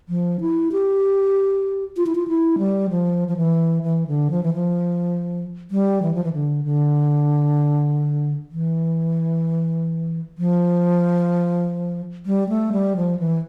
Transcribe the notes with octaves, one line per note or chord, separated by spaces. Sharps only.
F3
E4
G4
F4
E4
F4
E4
G3
F3
F3
E3
E3
D3
F3
E3
F3
G3
E3
F3
E3
D3
D3
E3
F3
G3
A3
G3
F3
E3